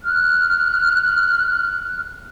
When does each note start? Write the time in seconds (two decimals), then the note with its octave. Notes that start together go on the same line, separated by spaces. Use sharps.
0.03 F6 F#6